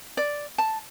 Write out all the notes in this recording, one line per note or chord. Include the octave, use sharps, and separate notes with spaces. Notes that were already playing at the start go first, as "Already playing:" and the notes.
D5
A5